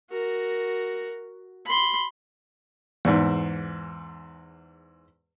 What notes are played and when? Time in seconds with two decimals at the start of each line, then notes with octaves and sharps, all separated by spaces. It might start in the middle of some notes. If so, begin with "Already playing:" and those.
0.11 F#4 A#4
1.66 B5 C6
3.05 E2 G#2